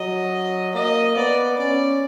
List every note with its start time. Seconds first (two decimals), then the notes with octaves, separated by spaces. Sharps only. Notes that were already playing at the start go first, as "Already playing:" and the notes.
Already playing: F#3 D#5
0.74 A#3 D#5
1.16 B3 D5
1.58 C#4 D5